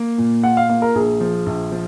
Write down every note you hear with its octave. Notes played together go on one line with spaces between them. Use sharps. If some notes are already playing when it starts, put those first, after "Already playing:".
Already playing: A#3
A#2
F4 F#5
F5
A#3 F5
A#4
A#1 G#4
F3
A#1
F3